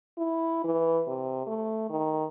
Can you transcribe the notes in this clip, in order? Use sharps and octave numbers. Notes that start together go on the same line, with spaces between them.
E4
E3
C3
A3
D#3